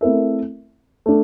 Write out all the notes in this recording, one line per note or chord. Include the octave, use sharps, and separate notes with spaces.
A3 C4 E4 A#4 E5
A3 D4